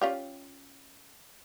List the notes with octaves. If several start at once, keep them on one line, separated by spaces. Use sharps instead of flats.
C#4 F4 G4